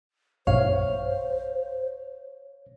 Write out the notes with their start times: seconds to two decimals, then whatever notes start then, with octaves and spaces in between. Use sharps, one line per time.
0.47 B1 G2 C5 C#5 F5